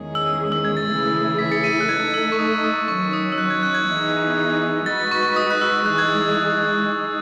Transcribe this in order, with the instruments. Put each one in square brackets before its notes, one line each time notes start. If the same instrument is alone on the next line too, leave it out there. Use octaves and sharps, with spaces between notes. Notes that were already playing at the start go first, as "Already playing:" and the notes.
Already playing: [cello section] E2 D#3 G#3 C#4 G#4
[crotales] E6
E6
G#6
A6
[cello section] C#3 E3 A3 E4 G#4
[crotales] B6
A6 C#7
B6 D#7
F#6
[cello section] A3 D#4 A4 [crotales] G#6
[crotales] E6
C#6
D#6
D#6
[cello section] D#3 F#3 C#4 [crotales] C#6
[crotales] D#6
E6
F#6
G#6
F#6
G#6
[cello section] E3 B3 D#4 G#4
[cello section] G#3 D#4 F#4 B4 D#5 [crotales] A6
[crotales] C#6
D#6
F#6
E6
[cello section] E3 G#3 D#4 G#4 [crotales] F#6
[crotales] G#6
[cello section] G#3 D#4 G#4